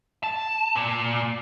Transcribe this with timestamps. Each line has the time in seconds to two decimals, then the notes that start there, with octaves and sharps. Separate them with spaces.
0.24 A5
0.75 A#2